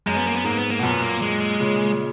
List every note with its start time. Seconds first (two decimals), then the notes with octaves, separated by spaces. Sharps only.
0.06 F#2 G#3
0.16 B3
0.26 A#3
0.35 B3
0.44 G#2 A#3
0.57 B3
0.70 A#3
0.79 B2
0.83 F#2 A#2 B3
1.02 A#3
1.22 G#3
1.60 A#2 C#3